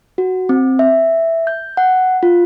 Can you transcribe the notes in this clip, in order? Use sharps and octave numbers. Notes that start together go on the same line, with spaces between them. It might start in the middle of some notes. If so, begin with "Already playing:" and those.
F#4
C4
E5
G6
F#5
F4